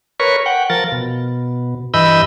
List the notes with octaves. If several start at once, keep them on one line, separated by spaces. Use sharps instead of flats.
A#4 B4 C#5 C#6
F#5 G5
F3 A#4 A6
B2
G2 E3 D#5 B5 E6 G6